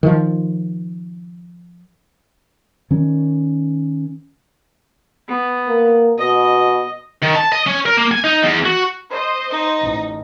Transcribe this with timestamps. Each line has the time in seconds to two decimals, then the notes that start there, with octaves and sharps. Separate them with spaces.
0.03 D#3 F3
2.91 D#3 C#4
5.28 B3
5.68 A#3
6.18 B2 D#5
7.23 D#3
7.35 A5
7.52 D#5
7.67 C#4
7.86 A#4
7.97 A#3
8.12 G#5
8.24 D#4
8.43 E2
8.66 F#4
9.11 C5 D#5
9.50 D#4
9.83 A1